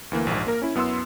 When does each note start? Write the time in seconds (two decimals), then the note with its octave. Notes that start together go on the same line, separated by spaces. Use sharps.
0.12 D2 E3 A#3
0.27 A#1 D#2 G#2
0.47 A#3 A#4
0.62 C#4 E4
0.75 F#2 B3 E4 C6 E6